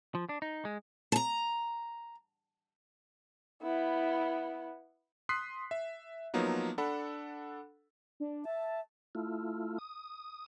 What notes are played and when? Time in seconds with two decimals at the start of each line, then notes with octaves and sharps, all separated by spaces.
0.15 F3
0.29 D4
0.42 D#4
0.65 G#3
1.12 A5 A#5
3.62 B3 E4
5.29 C6 D#6 F#6 B6 C7
5.71 E5
6.34 F3 F#3 A#3 B3 D#4
6.78 D4 A4 F#5 B5
8.20 D4
8.45 E5 A5
9.15 A3 E4 F4
9.78 D#6